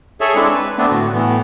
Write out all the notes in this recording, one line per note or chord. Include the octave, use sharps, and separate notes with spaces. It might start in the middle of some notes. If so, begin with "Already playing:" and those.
G#4 A4 C#5 E5
G#3 C4 D4 E4
B4
A3 B3 C4 D4
A2 D3 F#4
A2 E3 B3